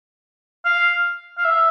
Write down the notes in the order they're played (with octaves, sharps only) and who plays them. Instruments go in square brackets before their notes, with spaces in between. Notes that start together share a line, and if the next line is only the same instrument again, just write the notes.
[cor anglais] F5
F5
E5